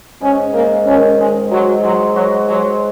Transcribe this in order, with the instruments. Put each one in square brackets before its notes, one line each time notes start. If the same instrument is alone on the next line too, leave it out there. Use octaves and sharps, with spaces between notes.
[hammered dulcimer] G#2 [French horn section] C#4
[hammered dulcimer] G#2 [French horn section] A#3
[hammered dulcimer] D#3 [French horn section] C#4
[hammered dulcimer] G#2 [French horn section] G#3
[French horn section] F#3 [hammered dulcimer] G#3
[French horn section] F#3 [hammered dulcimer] G#3
[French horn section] F#3 [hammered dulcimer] F#4
[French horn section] F#3 [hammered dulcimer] G#3